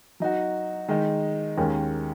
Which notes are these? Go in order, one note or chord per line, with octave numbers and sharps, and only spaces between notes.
F#3 D#4 F#4
D#3 G#3 D#4
D#2 D#3 G#3 C#4 A#4